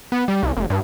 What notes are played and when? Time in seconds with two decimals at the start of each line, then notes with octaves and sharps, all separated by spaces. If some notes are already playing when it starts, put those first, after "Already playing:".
0.12 B3
0.28 G3
0.43 C2
0.57 F1
0.70 G2